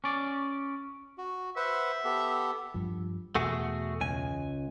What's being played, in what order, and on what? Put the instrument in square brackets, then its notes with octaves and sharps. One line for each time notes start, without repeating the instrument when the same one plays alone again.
[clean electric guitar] C#4 D5
[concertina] F#4
[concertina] B4 C5 F#5 [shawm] E5
[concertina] B3 G4 A4
[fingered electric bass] G2 F3
[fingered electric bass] E2 B2 [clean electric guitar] A3 F#4 G#4
[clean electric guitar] C#2 G#5